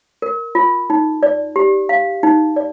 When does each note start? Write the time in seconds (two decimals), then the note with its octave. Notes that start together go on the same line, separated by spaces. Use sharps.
0.22 A#4
0.55 F4
0.90 D#4
1.23 D5
1.56 G4
1.89 F5
2.23 D#4
2.56 D5